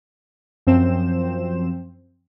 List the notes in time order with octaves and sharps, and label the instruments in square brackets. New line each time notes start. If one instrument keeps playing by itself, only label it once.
[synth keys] F#2 F3 C4 C5 E7